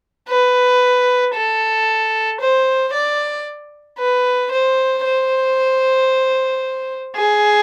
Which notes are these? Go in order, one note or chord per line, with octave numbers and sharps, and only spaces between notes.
B4
A4
C5
D5
B4
C5
C5
G#4